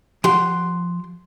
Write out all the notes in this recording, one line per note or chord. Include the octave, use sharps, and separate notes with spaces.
F3 G4 F#5 C6